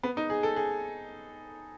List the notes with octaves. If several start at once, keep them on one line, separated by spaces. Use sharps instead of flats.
B3
D#4
G#4
A4
G#4